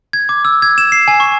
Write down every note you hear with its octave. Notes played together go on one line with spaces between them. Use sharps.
G#6
D6
E6
G#6
E7
C7
G#5
C#6